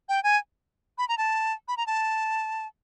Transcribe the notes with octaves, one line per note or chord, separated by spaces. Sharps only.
G5
G#5
B5
A#5
A5
B5
A#5
A5